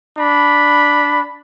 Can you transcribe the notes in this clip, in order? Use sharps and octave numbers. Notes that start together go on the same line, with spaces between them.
D4 B5